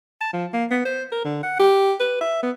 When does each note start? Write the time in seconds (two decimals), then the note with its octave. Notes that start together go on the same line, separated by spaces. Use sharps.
0.21 A5
0.33 F3
0.53 A#3
0.71 B3
0.85 C5
1.12 A#4
1.24 D3
1.43 F#5
1.59 G4
2.00 B4
2.21 E5
2.43 B3